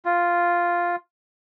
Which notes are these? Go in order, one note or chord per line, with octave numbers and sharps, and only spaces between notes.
F4